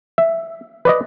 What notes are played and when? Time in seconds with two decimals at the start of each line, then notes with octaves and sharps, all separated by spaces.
0.18 E5
0.85 B4 D5 D#5